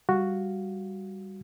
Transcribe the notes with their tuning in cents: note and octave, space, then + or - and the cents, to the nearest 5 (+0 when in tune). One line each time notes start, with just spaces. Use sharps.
G3 +0 F#4 +0 F5 +0